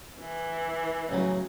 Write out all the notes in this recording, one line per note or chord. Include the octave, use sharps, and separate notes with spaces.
E3
A1 C#3 F#3